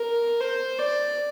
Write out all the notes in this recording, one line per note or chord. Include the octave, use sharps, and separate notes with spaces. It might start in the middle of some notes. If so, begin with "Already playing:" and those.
Already playing: A#4
C5
D5